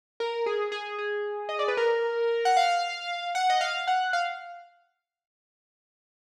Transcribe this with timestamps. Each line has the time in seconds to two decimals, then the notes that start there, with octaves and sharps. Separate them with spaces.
0.20 A#4
0.46 G#4
0.72 G#4
0.98 G#4
1.49 D#5
1.59 D5
1.68 B4
1.77 A#4
2.45 F#5
2.57 F5
3.35 F#5
3.50 D#5
3.61 F5
3.87 F#5
4.13 F5